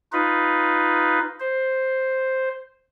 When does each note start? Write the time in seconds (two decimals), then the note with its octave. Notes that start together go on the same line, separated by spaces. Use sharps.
0.12 D#4 F4 B4
1.40 C5